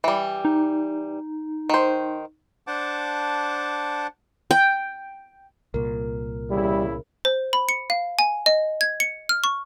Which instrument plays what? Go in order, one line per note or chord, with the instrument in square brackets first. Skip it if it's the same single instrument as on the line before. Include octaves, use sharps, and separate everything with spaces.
[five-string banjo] E3 G3
[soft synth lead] D#4
[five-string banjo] D#3 C5
[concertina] D4 C5 F#5 A5 D6
[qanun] G5
[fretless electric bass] C2 A#2 [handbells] A#4
[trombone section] E2 C#3 E4 [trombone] G3
[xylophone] C5
B5
C#7
F5
G#5
D#5
G#6
C#7
F6
C#6